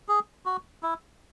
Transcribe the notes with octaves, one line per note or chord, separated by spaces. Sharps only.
G#4
F#4
E4